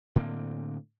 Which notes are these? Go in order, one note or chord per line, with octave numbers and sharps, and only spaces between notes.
A2 D3 A#3 C4